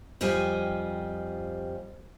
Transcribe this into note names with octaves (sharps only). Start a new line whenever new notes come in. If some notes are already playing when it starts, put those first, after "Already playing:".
F2 G3 F4 D#5 G#5